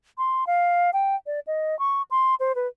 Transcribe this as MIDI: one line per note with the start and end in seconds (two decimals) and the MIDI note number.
0.18 0.47 84
0.47 0.91 77
0.93 1.16 79
1.26 1.40 74
1.47 1.78 75
1.79 2.02 85
2.11 2.35 84
2.40 2.52 72
2.55 2.67 71